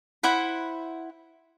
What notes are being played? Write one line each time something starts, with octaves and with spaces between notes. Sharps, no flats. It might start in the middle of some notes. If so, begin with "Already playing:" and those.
E4 C5 F#5 B5